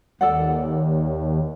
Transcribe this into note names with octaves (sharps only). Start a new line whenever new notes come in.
D#2 A4 D5 F#5